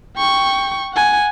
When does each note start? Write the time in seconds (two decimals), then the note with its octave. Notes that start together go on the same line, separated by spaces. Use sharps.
0.16 G5 C#6
0.93 F#5 G#5